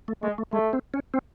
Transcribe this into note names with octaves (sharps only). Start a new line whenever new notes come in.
A3
G#3 A3
A3
G#3 A3
C4
C#4
C4